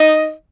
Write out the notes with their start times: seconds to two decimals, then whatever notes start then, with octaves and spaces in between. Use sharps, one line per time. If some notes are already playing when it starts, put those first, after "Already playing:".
Already playing: D#4 D#5